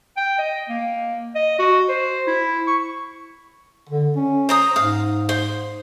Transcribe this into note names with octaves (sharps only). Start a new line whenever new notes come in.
G5
D#5
A#3
D#5
F#4
C5
E4
C#6
D3
C#4
C5 A#5 D#6
G#2 F5
C5